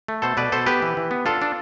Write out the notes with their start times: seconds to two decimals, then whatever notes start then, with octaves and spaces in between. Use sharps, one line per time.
0.08 A3
0.22 B2 A4 C5
0.37 B2 B4 D5
0.52 B2 A4 C5
0.66 B3 G4 B4
0.82 E3
0.97 E3
1.11 B3
1.26 D4 F4 A4
1.42 D4